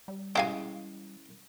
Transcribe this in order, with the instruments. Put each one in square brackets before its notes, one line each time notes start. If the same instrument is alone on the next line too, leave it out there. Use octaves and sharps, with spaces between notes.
[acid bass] G3
[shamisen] C#3 E3 G#3 [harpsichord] G4 F5 G#5